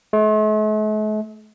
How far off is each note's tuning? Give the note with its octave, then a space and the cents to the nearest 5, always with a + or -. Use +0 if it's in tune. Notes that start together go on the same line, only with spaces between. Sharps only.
A3 -45